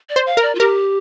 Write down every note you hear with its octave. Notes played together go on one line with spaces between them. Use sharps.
D5
C5
F5
A#4
D5
F4
G4 A#4